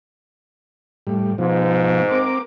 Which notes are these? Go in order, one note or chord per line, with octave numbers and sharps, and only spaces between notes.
A2 G3
G#2 B2 F3
C4 A#4 D6